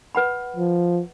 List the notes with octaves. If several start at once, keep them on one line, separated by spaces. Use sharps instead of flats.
B4 F#5 B5
F3